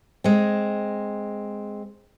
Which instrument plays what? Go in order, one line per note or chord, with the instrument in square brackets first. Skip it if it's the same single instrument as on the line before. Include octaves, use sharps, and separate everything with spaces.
[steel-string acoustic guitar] G#3 C4